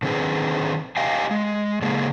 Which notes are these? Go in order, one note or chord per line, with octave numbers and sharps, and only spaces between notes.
D3 D#3 C4 E4 G#4 B4
G4 D#5 F5 G5 G#5
G#3
C#3 G#3 A#3 G#4